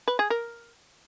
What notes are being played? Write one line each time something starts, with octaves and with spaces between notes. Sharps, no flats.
B4
G#4
A#4